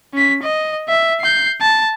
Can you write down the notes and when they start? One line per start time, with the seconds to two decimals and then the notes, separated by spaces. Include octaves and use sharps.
0.14 C#4 B6
0.43 D#5
0.89 E5
1.21 G6 C7
1.61 A5